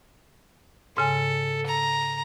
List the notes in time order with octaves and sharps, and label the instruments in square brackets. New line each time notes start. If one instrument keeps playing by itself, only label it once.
[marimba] G#2 C#3 G#5 [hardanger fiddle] A4
[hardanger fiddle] A#5